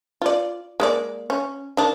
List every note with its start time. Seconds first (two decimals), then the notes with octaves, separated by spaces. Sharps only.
0.22 F4 D5
0.80 G#3 A#3 D5
1.30 C#4
1.77 D#3 D4